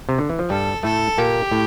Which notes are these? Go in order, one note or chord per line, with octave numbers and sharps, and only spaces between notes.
C3
D3
E3
F3
G2 G3 A4
A2 A3 A4
A#2 A#3 G4
A2